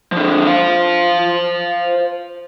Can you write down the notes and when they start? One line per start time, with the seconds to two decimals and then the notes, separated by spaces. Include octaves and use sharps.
0.12 D3 F3
0.47 C5 F5